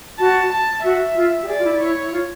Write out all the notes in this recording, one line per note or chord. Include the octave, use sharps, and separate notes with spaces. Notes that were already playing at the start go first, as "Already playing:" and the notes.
F#4 A5
A5
F#4 E5
F4
G4
G#4 D5
F4
E4
E4 C#5
E4
F4